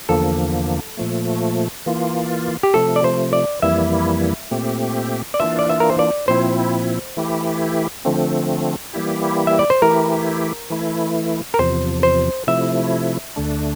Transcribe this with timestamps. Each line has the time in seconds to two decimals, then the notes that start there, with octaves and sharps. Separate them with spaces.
0.09 E2 D3 F3 A#3 A4
0.97 A#2 F3 A3
1.86 E3 A#3 F4
2.63 G4
2.74 C3 F3 A3 A4
2.96 D5
3.04 C5
3.33 D5
3.62 F2 E3 G3 A#3 E4 E5
4.51 A#2 A3 C4 G4
5.34 D5
5.40 E3 A#3 D4 F4 E5
5.59 D5
5.70 E5
5.80 A#4
5.90 C5
5.99 D5
6.28 A#2 F3 C4 E4 C5
7.17 E3 A3 E4 G4
8.05 D3 F3 A3 C4
8.93 E3 G3 A#3 E4 G4
9.47 E5
9.59 D5
9.70 C5
9.82 E3 A3 E4 G4 A#4
10.70 E3 A3 E4
11.54 A#4
11.59 E2 C3 F3 C5
12.03 C5
12.47 C3 F3 A3 E4 E5
13.36 D2 D3 A3 D4